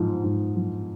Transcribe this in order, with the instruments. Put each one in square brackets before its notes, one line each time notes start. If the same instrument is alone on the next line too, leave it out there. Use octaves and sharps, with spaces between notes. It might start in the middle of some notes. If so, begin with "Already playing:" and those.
Already playing: [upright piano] G#2 F3
G#2
F3